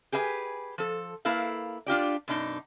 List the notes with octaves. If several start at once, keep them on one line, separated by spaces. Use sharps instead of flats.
G4 G#4 B4 D#5 G#5
F3 A4
A#3 E4 A4 B4 F5
D4 F4 G4 D5
F#2 B2 D4 D#4